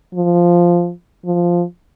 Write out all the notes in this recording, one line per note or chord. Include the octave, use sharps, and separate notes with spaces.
F3
F3